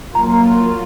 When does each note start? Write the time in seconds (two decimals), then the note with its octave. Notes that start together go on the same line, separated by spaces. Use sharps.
0.15 F#3 A#3 F4 A#5
0.33 A#5